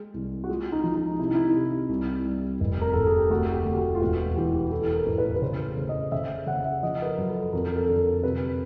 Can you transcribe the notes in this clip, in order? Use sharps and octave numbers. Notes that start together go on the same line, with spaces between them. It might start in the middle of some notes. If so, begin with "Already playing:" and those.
Already playing: G#3
C2
F#4
G#3 F4
D#4
F3
D#4
C3 E4
D#4
E4
C3
C2
G3
F1
A#4
F1 A4
G#4
G4
D2 F#4
G4
D2
F#4
F4
E1 F#4
E3 G4
E3 A4
A#4
A1
B4
B4
C#3 C5
C#3
D#5
C#3 E5
C#3 F#5
E5
F3 D#5
B4
A#4
F#2
A4
F2 A#4
A4
A#4
A4
D3
A#4
C3 B4